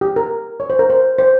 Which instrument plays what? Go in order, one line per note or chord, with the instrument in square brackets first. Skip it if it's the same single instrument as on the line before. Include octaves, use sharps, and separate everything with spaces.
[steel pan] G4
A#4
C#5
C5
A#4
C5
C5